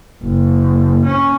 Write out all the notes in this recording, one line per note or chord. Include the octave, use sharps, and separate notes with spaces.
F#1
C#4